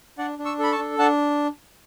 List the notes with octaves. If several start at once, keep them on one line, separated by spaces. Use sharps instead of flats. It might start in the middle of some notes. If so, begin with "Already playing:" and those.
D4 D5 F#5
D4
C#6 E6
A4 B5
A5 C#6
D4
D4 F#5 A5